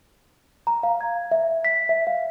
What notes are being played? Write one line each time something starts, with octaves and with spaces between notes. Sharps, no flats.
A#5
F5
G#6
E5
B6
E5
F5